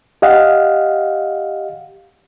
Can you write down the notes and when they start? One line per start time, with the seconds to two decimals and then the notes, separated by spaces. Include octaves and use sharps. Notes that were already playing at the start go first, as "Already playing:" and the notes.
0.22 G4 D#5 F5 F#5